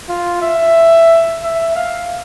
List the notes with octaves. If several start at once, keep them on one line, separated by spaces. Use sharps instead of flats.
F4
E5
E5
F5